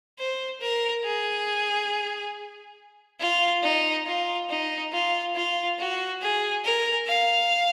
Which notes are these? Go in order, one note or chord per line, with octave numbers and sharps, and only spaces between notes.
C5
A#4
G#4
F4
D#4
F4
D#4
F4
F4
F#4
G#4
A#4
F5